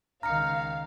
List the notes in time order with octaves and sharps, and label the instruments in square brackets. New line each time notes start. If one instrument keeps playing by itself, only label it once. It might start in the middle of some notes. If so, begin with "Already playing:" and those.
[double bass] C#2 D#3 [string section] F5 [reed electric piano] A#5 [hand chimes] F6 A#6 C#7